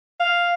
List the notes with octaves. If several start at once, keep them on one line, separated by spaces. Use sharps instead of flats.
F5